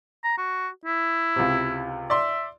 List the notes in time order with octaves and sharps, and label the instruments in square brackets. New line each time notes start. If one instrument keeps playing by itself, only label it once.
[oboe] A#5
F#4
E4
[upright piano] C#2 C3
[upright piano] D5 C6 [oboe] E5